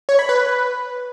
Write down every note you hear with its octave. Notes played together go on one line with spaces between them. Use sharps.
C#5
B5
B4